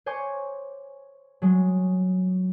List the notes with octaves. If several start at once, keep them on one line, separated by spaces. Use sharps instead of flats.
C5 C#5 G#5 C#6 D6 G6
F#3 G#3